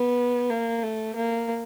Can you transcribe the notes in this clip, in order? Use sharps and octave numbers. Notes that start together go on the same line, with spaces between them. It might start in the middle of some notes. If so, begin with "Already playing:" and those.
Already playing: B3
A#3
A3
A#3